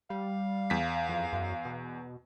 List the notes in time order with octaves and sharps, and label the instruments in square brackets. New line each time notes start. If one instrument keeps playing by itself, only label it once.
[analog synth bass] G3 [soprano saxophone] F5
[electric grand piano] E2 B6
[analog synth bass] F2
F#2
B2